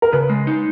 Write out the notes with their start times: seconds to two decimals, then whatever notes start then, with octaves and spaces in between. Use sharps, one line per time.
0.02 A#4
0.12 C#3 B4
0.30 G#3
0.47 D#4